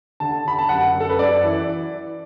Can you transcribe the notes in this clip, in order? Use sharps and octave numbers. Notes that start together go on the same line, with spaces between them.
D3 A5
D3 B5
A5
F#2 F#5
F#2
A4
B4
F#2 D5
E3